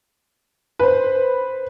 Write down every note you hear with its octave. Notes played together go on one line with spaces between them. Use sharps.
B4 C5